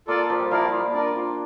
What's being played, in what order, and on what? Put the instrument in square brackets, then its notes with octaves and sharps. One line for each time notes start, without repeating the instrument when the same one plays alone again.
[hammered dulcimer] A#3 [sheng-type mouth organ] F4 A4 D5
[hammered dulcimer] F3
G3
[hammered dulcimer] F3 [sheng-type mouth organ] E4 A#4 D5 F5
[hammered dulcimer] G3
A#3
[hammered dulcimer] D4 [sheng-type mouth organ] F4 A#4 D5
[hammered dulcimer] F4